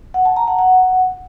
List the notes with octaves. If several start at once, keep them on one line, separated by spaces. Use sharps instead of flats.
F#5
A5
A#5
F#5
F#5